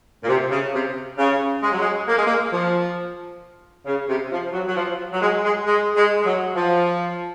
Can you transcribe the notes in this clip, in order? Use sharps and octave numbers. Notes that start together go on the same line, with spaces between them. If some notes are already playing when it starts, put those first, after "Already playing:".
A#2
C3
C#3
C3
C#3
G#3
F#3
G#3
A#3
G#3
A#3
F3
C#3
C3
F3
F#3
F#3
F3
F#3
G#3
G#3
G#3
G#3
G#3
F#3
F3